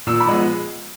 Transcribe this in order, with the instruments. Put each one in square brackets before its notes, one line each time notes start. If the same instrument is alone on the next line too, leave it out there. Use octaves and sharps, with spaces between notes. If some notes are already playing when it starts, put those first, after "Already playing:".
[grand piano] A#2 E6
B5
F3 G#3 B3